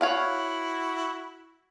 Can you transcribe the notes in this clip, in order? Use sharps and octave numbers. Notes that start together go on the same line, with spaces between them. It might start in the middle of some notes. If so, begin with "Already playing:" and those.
E4 F#4 C#5 F5 F#5